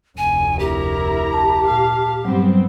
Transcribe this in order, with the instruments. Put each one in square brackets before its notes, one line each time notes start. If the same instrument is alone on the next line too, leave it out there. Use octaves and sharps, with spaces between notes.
[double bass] F1 D2 [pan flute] G#5
[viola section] E4 A#4 A#5 [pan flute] G4
[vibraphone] A5
[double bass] A#2 [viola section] F5
[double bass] G2 B3 [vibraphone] F#3 G3 [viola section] C4